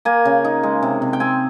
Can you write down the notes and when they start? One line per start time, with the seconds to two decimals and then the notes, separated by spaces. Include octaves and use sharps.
0.05 A#3 G#5
0.25 C#3
0.45 D#4
0.63 G#3
0.83 C3
1.02 C3
1.13 G5
1.20 C4 G#5